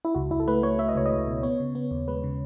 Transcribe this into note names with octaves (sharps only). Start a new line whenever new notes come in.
E4
C#2 F#4
C#2 E4
A4
A3 B4
A3 C#5
A3 E5
D#5
C#2 C#5
D#5
C#2
B2
B3 C#5
C#3
B3
D#2
G#3 B4
C#3